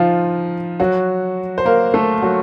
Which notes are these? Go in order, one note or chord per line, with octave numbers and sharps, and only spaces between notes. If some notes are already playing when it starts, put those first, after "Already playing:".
Already playing: F3 D#4 F4
F#3 F#4
C5
A#3 A#4
A3 A4
F#3 F#4